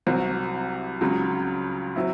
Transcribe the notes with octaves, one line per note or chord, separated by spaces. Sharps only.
C2 C3 F#3 C4
C#2 C#3 F#3
F#3 C4 E4